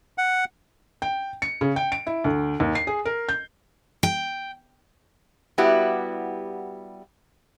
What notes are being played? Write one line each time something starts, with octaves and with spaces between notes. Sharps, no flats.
F#5
G5
C#7
C#3
G5
D7
E4
D2
D#2
C7
G#4
A#4
G6
G5
G3 B3 E4 F#4 G4